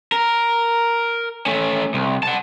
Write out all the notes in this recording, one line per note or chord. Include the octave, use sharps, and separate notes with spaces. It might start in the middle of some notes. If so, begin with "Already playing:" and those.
A#4
A3 C#4
C2
F#5 A5